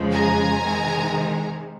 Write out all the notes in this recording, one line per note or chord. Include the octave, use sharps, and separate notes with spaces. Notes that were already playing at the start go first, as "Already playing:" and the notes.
Already playing: F2 C#3 F3 G#3
G#5 A#5
C3 D#3 G#3